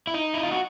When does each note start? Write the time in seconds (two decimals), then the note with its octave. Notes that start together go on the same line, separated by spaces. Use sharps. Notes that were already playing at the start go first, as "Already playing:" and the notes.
0.07 E4
0.14 D#4
0.34 E4
0.43 F4
0.51 F#4